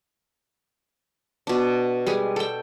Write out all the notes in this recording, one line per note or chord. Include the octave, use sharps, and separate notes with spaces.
B2 D4
G3 G#3 G#4
A4 G5